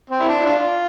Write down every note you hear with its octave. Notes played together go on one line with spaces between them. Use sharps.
C4
E4
D4
E4
D4 F4